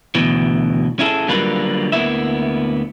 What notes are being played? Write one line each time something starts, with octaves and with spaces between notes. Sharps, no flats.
D2 B2 E3
C#4 E4 G#4 A4
D3 F#3 G3 A#3 F4 B4
D2 A#3 B3 E4 E5